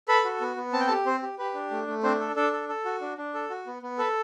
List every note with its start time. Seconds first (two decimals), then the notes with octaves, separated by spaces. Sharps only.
0.08 A4 B4 B5
0.25 F#4
0.41 B3
0.56 B3
0.73 C4 A5
0.80 G5
0.87 G4 A4 A5
1.06 C4 C5
1.23 G4
1.38 G4 B4
1.54 D4
1.71 A3
1.87 A3
2.03 C4 D4 C5
2.20 A4
2.36 D4 A4
2.53 A4
2.69 A4
2.85 F#4
3.01 D4
3.18 D4
3.34 A4
3.50 F#4
3.67 B3
3.82 B3
3.98 A4 B4